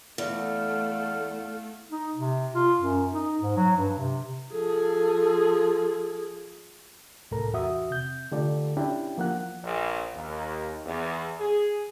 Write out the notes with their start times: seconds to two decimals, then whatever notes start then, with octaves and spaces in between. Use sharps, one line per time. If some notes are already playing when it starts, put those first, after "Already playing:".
0.18 E2 A3 A4 F5 F#5 F6
1.92 D#4
2.16 C3
2.55 F4
2.81 F#2
3.13 D#4
3.41 G#2
3.57 F#3
3.77 G2
3.98 C3
4.52 F3 G#4 A4
7.31 C2 A2 A4 A#4 A#5
7.53 E2 F#4 E5 D#6
7.90 C3 G6
8.32 D3 A3 F4 G4 A4 D5
8.77 C#4 D4 E4 G4 G5
9.18 F3 A#3 F#5 F#6
9.64 A#1
10.15 D#2
10.85 E2
11.40 G#4